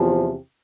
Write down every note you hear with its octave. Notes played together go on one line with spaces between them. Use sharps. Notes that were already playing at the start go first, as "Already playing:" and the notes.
Already playing: E2 C3 F3